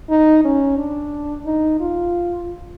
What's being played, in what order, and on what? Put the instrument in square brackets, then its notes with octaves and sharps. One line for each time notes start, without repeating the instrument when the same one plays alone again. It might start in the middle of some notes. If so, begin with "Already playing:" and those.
[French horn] D#4
C#4
D4
D#4
F4